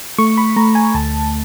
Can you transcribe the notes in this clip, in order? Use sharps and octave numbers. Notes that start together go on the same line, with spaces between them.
A3 C#6
B5
A3 A#5
G#5
D2 A5